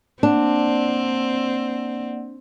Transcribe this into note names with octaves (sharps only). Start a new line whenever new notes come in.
A#3 C4 D4 D5 F#5